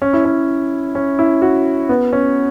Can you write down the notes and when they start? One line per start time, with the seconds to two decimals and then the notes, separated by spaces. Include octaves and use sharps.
0.02 C#4
0.13 E4
0.25 C#4
0.95 C#4
1.19 E4
1.42 F#4
1.89 B3
2.13 C#4